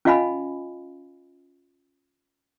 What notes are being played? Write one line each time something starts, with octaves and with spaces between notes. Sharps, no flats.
C#4 F4 D#5 F5 G#5 B5